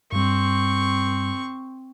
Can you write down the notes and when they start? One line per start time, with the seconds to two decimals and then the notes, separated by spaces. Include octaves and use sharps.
0.12 G2 G3 C4 C#6